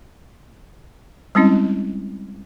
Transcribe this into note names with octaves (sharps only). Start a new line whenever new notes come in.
G3 G#3 C4 C#4 E4